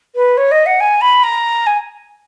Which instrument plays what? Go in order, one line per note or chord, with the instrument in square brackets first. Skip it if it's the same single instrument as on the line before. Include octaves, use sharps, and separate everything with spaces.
[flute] B4
C#5
D#5
F#5
G#5
B5
A#5
G#5